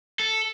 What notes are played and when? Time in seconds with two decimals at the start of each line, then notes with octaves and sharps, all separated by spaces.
0.19 A4